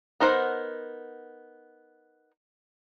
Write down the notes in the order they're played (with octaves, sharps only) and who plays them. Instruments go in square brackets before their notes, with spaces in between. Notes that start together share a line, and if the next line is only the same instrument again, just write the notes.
[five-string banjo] B3 D#4 A#4 C5 F#5